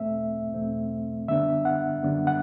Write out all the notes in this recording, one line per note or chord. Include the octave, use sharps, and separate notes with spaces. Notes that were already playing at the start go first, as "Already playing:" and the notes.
Already playing: E2 B2 A3 C4 E5
E2 B2 A3 C4
F#2 D3 G3 B3 D4 E5
F#5
F#2 D3 G3 B3 D4
F#5